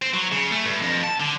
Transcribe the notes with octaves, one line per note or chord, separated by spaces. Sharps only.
C4
F#3
C#3
A3
G2
F2
A5
D3